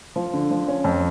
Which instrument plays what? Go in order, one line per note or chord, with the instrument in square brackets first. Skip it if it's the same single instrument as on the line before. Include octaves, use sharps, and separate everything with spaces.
[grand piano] F3
D3
F3
C#4
F2